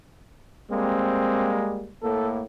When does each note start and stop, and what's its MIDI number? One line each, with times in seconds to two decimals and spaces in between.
0.71 1.90 55
0.71 1.90 56
0.71 1.90 58
0.71 1.59 60
2.03 2.44 45
2.03 2.44 58
2.03 2.29 69